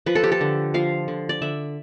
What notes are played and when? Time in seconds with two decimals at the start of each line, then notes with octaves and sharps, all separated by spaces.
0.06 F3 B4
0.15 A4
0.24 G4
0.32 A4
0.41 D3
0.74 F3 F5
1.08 D3
1.29 D5
1.42 D3 E5